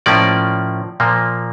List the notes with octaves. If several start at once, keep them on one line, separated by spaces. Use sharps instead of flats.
A2 F3 A#3 C#4 D5
A#2 F3 A#3